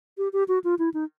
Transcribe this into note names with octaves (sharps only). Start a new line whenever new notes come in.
G4
G4
F#4
F4
E4
D#4